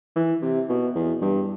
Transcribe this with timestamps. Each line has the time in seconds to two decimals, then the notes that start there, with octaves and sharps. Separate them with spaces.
0.16 E3
0.42 C3
0.69 B2
0.95 E2
1.22 G2